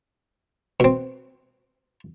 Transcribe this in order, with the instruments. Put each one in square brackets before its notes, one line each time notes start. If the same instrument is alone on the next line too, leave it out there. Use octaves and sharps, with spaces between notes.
[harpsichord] B2 C4